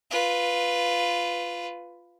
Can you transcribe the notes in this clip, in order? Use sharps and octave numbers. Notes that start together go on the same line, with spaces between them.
F4 B4